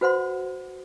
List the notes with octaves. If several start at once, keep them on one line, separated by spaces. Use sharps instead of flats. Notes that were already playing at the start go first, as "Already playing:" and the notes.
F#4 B4 C5 F#5 C6